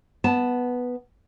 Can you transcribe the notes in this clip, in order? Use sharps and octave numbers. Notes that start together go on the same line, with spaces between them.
B3 A5